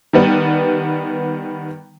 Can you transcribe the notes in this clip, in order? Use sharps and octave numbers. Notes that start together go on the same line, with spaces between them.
D#3 G3 B3